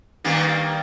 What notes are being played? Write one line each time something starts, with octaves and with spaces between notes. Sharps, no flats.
G2 D#3 A#3